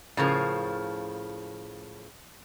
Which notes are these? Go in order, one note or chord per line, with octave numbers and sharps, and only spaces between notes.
A2 C#3 F3 A#4